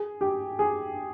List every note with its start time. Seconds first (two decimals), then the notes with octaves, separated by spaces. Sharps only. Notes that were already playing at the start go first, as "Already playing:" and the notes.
Already playing: G#4
0.21 G4
0.59 G#4